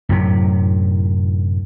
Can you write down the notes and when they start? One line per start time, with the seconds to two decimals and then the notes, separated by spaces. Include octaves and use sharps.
0.09 F#2 A2 C3